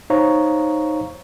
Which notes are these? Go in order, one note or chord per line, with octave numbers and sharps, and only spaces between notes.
D#4 C5 C#5 F5 A#5 C#6